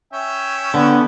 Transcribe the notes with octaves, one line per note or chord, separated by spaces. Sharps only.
C#4 E5 G5
D3 B3